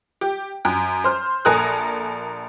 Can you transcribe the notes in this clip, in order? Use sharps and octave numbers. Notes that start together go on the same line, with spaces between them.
G4
F#2
C5 F6
A#1 A4 A#4 G#5 D#6 F#6